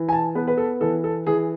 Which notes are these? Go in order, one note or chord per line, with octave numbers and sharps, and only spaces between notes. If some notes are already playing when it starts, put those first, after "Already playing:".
Already playing: E3
G#5
A5
B3 B4
B4
A4
E3 A4
A4
E3 G#4